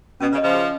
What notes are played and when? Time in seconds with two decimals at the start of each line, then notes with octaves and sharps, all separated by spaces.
0.20 B2 C#4
0.32 C#3
0.37 D#5
0.42 C#3 F3
0.55 G#4